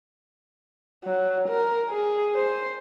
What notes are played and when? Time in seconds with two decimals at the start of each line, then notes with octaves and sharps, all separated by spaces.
1.05 F#3
1.48 A#4
1.89 G#4
2.35 C5